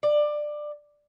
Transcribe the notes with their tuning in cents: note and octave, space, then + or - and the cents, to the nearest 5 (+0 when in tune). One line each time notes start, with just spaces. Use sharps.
D5 +15